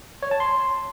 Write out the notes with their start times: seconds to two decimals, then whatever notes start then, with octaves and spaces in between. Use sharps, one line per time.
0.23 C#5
0.31 A5
0.40 C6